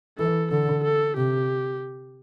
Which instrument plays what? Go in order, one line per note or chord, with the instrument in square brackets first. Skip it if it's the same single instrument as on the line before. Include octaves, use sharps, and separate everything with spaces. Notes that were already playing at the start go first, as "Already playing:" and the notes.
[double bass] E3 [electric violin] A4
[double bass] D3 [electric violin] A4
[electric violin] A4
[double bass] C3 [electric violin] G4